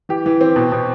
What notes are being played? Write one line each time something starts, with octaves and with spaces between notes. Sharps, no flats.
E3 G4
E3
C4
B2
B2